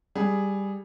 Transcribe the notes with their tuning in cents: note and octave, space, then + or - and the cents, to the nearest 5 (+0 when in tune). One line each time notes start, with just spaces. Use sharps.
G3 +10 G#4 +0